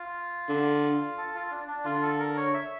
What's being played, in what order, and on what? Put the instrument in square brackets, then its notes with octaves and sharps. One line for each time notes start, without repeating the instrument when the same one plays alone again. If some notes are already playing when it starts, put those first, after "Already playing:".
Already playing: [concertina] F4
[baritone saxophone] D3
[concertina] A4
F4
D4
D4
[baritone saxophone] D3 [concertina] F4
[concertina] A4
A#4
C#5
E5